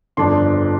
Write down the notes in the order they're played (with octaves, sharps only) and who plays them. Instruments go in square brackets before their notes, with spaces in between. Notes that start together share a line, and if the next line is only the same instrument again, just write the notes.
[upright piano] G1 F2 F3 D4 C6